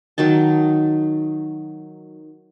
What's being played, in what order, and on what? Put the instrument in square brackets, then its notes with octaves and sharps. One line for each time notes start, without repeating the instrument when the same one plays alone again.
[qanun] D#3 F#3 D#4 A5